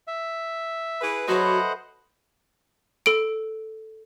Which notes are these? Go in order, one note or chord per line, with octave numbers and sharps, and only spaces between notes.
E5
E4 G#4 B4
F#3 F#4 A4 B4 C5 D#5 E5 F#5
A4 D7